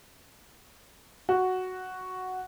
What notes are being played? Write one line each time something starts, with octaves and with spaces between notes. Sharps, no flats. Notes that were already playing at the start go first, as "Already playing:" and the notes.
F#4